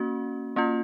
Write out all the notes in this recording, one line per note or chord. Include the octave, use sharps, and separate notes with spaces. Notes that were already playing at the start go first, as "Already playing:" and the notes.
Already playing: A#3 C#4 F#4
A#3 C#4 F4